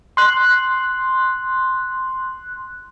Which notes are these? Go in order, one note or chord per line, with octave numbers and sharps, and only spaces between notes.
C6 F#6